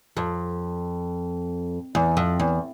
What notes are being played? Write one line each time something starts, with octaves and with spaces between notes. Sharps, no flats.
F2
E2
F2
E2